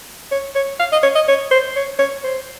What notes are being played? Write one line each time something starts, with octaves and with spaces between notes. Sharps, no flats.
C#5
C#5
F5
D#5
C#5
D#5
C#5
C5
C#5
C#5
C5